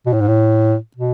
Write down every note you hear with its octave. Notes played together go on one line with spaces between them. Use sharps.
B2
A2
G#2
A2
B2